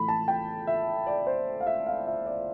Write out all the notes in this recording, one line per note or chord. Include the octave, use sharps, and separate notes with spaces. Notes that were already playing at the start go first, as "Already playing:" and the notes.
Already playing: A2 E3 A3 B5
A5
G5
E5
D5
C5
F5
E5
F5
E5
D5